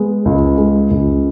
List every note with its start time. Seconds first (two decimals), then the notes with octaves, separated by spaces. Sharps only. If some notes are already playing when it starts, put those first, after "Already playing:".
Already playing: G#3 B3
0.25 C#2
0.58 G#3
0.91 C#2